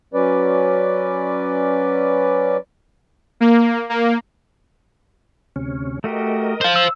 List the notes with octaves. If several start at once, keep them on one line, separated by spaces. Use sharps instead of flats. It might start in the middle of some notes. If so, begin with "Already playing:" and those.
F#3 C#4 B4 D5
A#3
A#3
D2 C3 C#4
A3 F#4 G4 A#4 D#5
C5 F5
E6